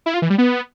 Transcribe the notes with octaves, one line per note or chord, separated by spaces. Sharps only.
E4
F4
E3
G3
B3